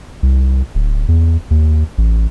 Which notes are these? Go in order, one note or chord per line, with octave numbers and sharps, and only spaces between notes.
C2
D1
E2
D#2
A1